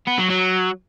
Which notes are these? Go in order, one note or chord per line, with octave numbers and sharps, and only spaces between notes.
B3
F#3
F#3